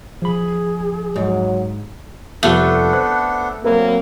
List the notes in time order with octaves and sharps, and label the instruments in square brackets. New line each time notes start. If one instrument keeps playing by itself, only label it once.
[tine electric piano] F3 B5 [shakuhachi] G#4
[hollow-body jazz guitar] G#2 [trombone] F#3
[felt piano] F1 F3 G3 [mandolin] A3 [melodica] B3 D4 A4
[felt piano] C5 F#6
[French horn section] F#3 A#3 C4 [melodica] E4 [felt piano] A#4